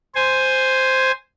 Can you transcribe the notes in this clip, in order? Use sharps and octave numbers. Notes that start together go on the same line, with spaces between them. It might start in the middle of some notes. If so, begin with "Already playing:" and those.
C5 G#5